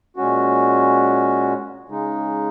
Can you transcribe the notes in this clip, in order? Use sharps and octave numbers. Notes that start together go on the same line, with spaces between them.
A#2 G#3 C#4 F#4
C#3 G#3 D#4